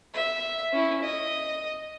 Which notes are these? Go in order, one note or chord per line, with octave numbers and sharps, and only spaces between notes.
E5
C#4 E4
D#5